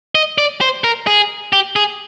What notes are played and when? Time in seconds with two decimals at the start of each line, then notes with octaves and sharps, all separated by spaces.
0.15 D#5
0.38 D5
0.61 C5
0.84 A#4
1.07 G#4
1.53 G4
1.76 G#4